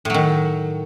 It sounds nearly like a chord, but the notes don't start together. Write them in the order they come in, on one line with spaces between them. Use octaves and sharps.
A2 F#3 D#3